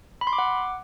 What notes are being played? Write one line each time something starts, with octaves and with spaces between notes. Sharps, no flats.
B5
C6
D6
F#5